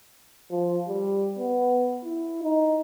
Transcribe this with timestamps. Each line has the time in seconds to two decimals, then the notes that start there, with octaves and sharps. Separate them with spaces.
0.51 F3
0.88 G3
1.38 B3
2.05 E4
2.43 D#4